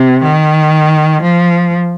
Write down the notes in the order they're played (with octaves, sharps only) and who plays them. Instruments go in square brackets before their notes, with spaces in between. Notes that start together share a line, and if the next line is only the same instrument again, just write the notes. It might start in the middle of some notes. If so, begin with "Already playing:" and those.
Already playing: [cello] C3
D#3
F3